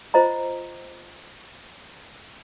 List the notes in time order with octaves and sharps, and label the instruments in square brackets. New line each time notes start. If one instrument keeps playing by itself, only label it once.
[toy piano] F4 C5 D#5 A#5